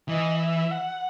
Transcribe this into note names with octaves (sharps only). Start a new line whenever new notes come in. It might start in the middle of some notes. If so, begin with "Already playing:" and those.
E3 D#5
E5
F#5